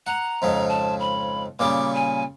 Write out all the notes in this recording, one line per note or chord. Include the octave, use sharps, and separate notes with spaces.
F#5 A#5
F2 G#2 C#3
A5
B5
A#2 C#3 G3 D6
G#5